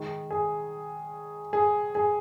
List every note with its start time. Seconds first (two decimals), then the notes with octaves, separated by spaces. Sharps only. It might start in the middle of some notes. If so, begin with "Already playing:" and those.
Already playing: D#3 G#3
0.31 G#4
1.53 G#4
1.95 G#4